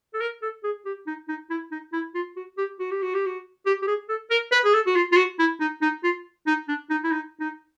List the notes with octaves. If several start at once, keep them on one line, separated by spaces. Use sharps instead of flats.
A4
A#4
A4
G#4
G4
D#4
D#4
E4
D#4
E4
F4
F#4
G4
F#4
G4
F#4
G4
F#4
G4
G4
G#4
A4
A#4
B4
G#4
A4
F#4
F4
F4
F#4
E4
D#4
D#4
F4
D#4
D4
D#4
E4
D#4
D#4